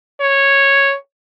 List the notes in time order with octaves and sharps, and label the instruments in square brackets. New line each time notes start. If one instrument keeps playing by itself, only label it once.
[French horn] C#5